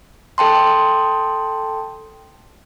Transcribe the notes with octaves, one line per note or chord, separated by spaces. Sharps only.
A4 G5 A5 C6